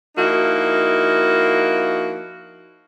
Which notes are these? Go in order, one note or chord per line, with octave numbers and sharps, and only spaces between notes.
F3 A#3 D#4 E4 F#4